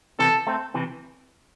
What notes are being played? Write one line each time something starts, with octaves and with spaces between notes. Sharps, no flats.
C3 E3 A4
A3 C4
C3 E3